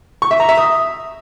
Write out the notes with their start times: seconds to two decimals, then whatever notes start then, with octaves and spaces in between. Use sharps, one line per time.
0.22 C#6
0.31 E5
0.40 A#5
0.49 E5
0.58 D#6